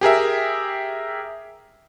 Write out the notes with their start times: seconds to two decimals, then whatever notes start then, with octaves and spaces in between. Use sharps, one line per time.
0.01 G4 G#4 A#4 E5